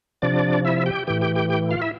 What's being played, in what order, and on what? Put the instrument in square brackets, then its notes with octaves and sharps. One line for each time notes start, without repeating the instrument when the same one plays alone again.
[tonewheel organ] C3 F3 D4 D5
E4 E5
G4 G5
A2 E3 G4 G5
G4 G5
G4 G5
G4 G5
F4 F5
E4 E5